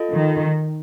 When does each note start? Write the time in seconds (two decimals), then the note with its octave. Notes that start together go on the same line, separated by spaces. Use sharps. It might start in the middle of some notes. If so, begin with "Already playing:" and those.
Already playing: F4 A4 D#5
0.12 D#3